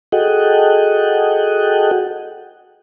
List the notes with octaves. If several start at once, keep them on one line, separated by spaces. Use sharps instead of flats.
F#4 G#4 A4 D#5 F#5 G5